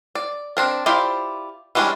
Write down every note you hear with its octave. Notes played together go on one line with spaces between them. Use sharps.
D5
C4 D4 A#4
E4 F4 G4 C5 D5
E3 G3 G#3 C#4 D4